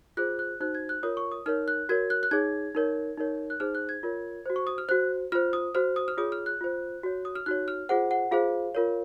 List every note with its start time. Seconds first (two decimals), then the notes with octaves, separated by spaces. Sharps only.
0.17 F4 G#4 C5 F#6
0.39 F#6
0.61 D#4 F#4 C5 F#6
0.75 G#6
0.89 F#6
1.03 F4 A#4 C#5 D#6
1.17 C#6
1.32 D#6
1.46 D#4 A#4 C#5 F6
1.68 F#6
1.89 F#4 A#4 C#5 G#6
2.10 F#6
2.23 F#6
2.31 D#4 G#4 C#5 G#6
2.75 D#4 A#4 C#5
3.18 D#4 A#4 C#5
3.50 F#6
3.60 D#4 G#4 C5 F6
3.75 F#6
3.89 G#6
4.03 F4 A#4 C#5
4.46 F#4 C5
4.56 C#6
4.67 D#6
4.78 F6
4.89 F#4 C5 F#6
5.32 F4 C5 F6
5.53 D#6
5.75 F#4 C5 F6
5.96 D#6
6.08 F6
6.17 F4 G#4 C#5 D#6
6.32 F6
6.46 F#6
6.61 F4 C5
7.03 F#4 C#5
7.25 D#6
7.35 F6
7.46 D#4 F#4 C#5 F#6
7.68 F6
7.89 F4 G#4 C5 F#5
8.11 F#5
8.31 F4 G#4 C5 F5
8.75 F4 A#4 C#5